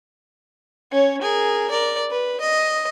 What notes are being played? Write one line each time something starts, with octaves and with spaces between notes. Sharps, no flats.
C#4 C#5
G#4 A#4
A#4 D5
B4
D#5